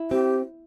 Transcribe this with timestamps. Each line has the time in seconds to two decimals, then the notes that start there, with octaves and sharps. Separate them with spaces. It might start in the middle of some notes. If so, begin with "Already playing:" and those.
Already playing: E4
0.11 C4 G4